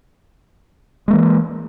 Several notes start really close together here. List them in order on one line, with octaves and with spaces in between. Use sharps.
G#3 A#3 E3